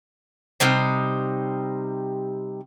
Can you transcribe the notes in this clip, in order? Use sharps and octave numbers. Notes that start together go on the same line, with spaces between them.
C3 G3 D#4 C5